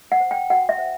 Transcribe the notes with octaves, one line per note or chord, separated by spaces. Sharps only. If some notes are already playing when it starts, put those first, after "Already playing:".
F#5
C5
G5
F#4 F#5
E5
C5